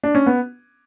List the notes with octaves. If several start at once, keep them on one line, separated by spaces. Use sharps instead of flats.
D4
C#4
B3